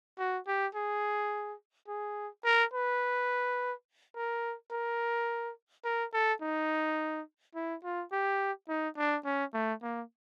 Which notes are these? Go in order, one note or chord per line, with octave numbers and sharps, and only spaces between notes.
F#4
G4
G#4
G#4
A#4
B4
A#4
A#4
A#4
A4
D#4
E4
F4
G4
D#4
D4
C#4
A3
A#3